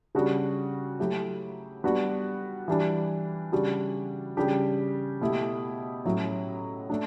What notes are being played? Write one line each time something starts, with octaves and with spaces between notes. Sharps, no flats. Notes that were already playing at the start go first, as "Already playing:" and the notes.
C#3 G3 D4 F#4
F#3 A3 E4 G4
G3 B3 D4 F#4
E3 G3 D4
C#3 G3 D4 F#4
C#3 G3 D4 G4
B2 A3 E4 G4
A2 F#3 C#4 E4
A3 D4